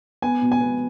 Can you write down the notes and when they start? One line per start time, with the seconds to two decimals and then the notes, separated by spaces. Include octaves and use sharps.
0.22 B3 G#5
0.42 B2
0.52 G#5
0.61 B3